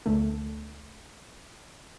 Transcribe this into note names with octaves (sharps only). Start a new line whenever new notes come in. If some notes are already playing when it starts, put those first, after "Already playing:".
D2 D3 A3